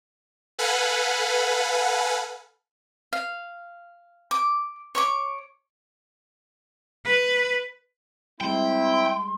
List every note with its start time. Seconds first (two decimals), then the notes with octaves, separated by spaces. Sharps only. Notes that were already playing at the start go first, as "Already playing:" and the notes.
0.59 A4 B4 F5 F#5 G#5 B5
3.13 F5
4.31 D6
4.95 C#5 C#6 D6
7.05 B4
8.41 G3 G#3 C4 E4 G5 C6